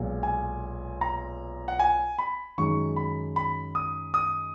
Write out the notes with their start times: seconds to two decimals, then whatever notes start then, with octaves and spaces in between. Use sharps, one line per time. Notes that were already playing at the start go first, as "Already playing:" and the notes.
Already playing: B1 A#2 G#3
0.23 G#5
1.01 A#5
1.68 F#5
1.79 G#5
2.18 B5
2.58 F#2 D#3 G#3 D#4 C#6
2.96 B5
3.36 B5
3.75 D#6
4.14 D#6